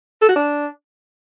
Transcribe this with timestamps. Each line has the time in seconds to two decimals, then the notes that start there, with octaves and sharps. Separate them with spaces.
0.22 A4
0.29 F#4
0.36 D4